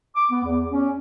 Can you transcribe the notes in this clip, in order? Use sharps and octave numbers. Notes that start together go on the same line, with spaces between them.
D6
B3
E2
C#4